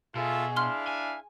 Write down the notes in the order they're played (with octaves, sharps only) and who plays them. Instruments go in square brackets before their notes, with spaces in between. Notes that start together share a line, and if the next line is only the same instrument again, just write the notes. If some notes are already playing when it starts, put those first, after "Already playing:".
[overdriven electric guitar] B2 [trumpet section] F4 A4 E5 [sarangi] G#4
[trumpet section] D4 E4 F5 [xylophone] C6 F6
[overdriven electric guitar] G#5